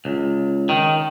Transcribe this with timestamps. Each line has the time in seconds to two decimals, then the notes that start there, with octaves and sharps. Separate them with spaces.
0.05 C#2
0.69 D#3